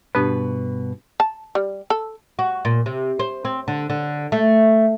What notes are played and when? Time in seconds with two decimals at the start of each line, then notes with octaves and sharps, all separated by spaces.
0.15 G2 B2 D4 G4 B4
1.20 A5
1.55 G3
1.90 A4
2.39 F#4
2.65 A#2
2.86 C3
3.19 C5
3.45 C4
3.68 D3
3.90 D3
4.32 A3